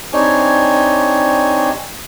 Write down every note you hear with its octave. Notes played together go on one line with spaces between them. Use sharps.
C4 D4 D#4 G4 C#5 G#5